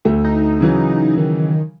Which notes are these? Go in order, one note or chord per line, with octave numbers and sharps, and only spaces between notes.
D2 A3
D#4
C#3 E3 F#3
D#3